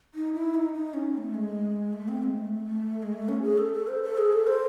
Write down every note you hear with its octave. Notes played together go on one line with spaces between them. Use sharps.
D#4
E4
D#4
D#4
C#4
C4
A3
G#3
A3
C4
G#3
A3
A3
G#3
A3
C#4
G#4
A4
A4
C5
A4
G#4
A4
C5